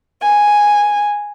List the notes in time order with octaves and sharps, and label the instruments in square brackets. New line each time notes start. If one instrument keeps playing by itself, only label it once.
[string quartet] G#5